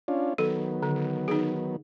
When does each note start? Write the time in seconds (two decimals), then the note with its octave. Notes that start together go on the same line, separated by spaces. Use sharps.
0.08 C#4 D4 F4
0.38 D#3 F#3 B3 A4
0.83 D3
1.28 D#4 G#4